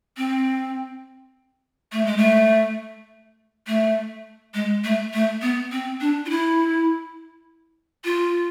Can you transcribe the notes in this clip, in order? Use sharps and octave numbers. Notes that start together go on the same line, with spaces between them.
C4
A3
G#3
A3
A3
G#3
A3
A3
B3
C4
D4
F4
E4
F4